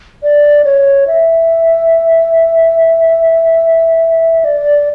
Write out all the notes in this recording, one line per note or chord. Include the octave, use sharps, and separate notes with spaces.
D5
C#5
E5
D5